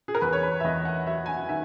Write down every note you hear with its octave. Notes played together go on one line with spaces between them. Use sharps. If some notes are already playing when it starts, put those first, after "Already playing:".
G#4
A#4
E2 B4
C#5
B4
E5
E2 D#5
F#5
F#3 E5
G#5
F#5
D#3 E5